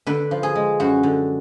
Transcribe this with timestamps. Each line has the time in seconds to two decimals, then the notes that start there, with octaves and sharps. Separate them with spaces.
0.06 D3 B4
0.31 F3
0.43 G#4
0.55 G#3
0.80 F#2 F#4
1.03 D3